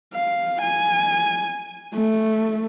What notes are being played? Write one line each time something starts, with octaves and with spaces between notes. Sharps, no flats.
F5
G#5
A3